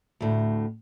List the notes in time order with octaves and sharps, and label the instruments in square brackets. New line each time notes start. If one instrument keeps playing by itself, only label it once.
[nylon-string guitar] D2 A2